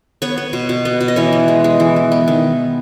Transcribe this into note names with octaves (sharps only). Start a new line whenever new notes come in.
B3 C#5
B3
B2
B2
B3
B2
D#5
E3 C#5
B3
G#3
G#3
E3
E3
B3
D#3